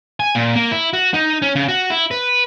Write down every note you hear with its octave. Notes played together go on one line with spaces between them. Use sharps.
G#5
A#2
A#3
E4
F#4
D#4
C#4
C#3
F#4
E4
B4